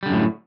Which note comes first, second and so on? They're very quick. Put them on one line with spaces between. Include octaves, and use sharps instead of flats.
G3 D3 F#2 A2